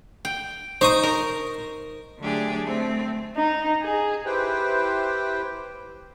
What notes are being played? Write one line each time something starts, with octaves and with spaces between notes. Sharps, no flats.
G5
D#4 C5 C#6 D#6
A#4
D3 F#3 A3 D4 G4 G#4
A3 C4
D#4
G#4
E4 G4 B4 C5 G5